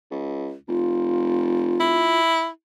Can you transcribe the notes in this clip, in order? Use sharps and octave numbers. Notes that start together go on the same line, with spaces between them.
C#2
F1 F4
E4